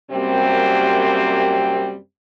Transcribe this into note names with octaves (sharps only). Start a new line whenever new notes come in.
F#2 C3 G3 A#3 C4